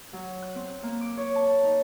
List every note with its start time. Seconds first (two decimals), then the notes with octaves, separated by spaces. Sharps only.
0.13 F#3
0.42 F#6
0.55 C4
0.83 A#3
1.01 D6
1.17 C#5
1.35 A5
1.63 D#4